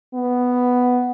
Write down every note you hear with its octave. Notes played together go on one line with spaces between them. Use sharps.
B3